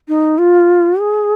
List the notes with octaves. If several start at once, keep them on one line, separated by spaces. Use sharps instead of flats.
D#4
F4
G#4